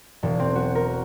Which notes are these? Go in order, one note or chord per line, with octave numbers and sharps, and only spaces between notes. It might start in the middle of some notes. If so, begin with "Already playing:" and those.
E1
C4
F#4
A#4